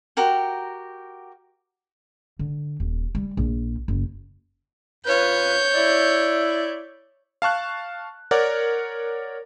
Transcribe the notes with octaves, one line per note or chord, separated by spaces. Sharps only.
F#4 G4 A#4 G5
D3
D#1
G3
A#1
F#1
F2 F4 B4 C#5 G6
E4 D5
F5 A5 C#6 F#6
A#4 C#5 D5 F#5